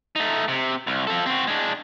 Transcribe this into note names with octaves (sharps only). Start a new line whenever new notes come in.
A3 D#4
C3
C2
F3 A4
C4 F#4
G#3 D4